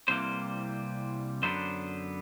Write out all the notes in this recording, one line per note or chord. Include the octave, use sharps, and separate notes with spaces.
C2 C3 E3 G3 A#3 C5
F#2 D3 F#3 B3 D4 C5